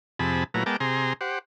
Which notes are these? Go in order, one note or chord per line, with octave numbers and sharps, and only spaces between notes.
F2 C3 G#4 A5 B5
A#2 F#3 A3 E4 B4 A#5
G#3 B3 A#4 G5 A5 D6
C3 G#4 A#5 C6
G4 C5 F#5